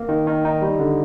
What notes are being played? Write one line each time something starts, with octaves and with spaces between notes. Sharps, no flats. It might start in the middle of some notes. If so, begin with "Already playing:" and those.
Already playing: A#3
D#3
D#3
D#4
G3
D3